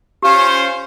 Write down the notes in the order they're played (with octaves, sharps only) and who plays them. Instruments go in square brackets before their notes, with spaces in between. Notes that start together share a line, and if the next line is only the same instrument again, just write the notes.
[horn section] C#4 F4 C5 [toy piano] G4